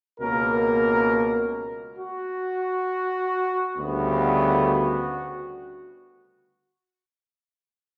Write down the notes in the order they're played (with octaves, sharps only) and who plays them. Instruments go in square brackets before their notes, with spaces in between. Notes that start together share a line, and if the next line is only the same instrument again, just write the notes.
[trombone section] C#2 B2 A#3 A#4
F#4
D2 C#3 G3 B3
F#4